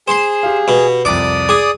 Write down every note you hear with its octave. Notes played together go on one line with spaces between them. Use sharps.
G#4 C5 C6
G4 F5
B2
C2 F2 D5 D6 D#6
G#4 D6